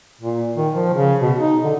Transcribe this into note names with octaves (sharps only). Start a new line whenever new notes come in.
A#2
D#3
F3
C#3
B2
D#4
D3